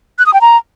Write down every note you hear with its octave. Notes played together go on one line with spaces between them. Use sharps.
F#6
D#6
G5
A#5